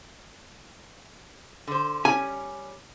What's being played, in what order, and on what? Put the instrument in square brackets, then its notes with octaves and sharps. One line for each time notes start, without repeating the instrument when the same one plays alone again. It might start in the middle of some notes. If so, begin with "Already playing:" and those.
[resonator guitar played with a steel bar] D3 C5
[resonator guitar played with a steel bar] G3 C#4 [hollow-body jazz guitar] G#5